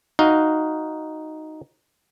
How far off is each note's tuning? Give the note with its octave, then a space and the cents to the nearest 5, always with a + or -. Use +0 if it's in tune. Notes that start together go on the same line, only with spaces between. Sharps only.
D#4 +0 F#4 +0 F5 +0